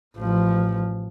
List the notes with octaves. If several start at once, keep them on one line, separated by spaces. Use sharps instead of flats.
A1 F3